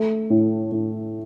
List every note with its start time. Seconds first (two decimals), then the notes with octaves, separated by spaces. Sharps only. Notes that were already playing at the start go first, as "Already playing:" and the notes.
Already playing: A3
0.30 A2
0.72 A2